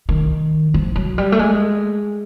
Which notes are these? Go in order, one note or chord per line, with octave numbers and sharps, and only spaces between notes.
D#3
F3
F#3
G3
A3
G#3